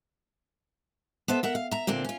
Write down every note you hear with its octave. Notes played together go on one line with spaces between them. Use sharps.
B3 A4 C5 E5
A#4 E5 F#5
F5
E5 A#5
A#2 D3 C4 D4
C#4 F4